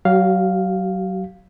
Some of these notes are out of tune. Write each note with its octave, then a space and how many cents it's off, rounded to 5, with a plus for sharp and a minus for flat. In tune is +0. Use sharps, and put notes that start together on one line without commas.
F#3 +25 G4 -45 F5 +0